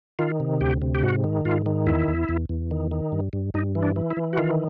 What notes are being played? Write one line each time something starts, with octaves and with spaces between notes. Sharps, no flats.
D#3 F4
C3
D2 G4
C3
G4
G#2 F#4
D#3
G#2 F4
D#3
E2 E4
E2
E2
E2
D#3
D#3
G2
G2
G2 D#4
E3
D4
E3
E4
E3
F#4
D#3 F4